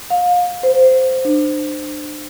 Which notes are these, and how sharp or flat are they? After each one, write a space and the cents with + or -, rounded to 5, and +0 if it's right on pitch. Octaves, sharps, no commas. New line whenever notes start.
F5 +30
C5 -10
D4 +35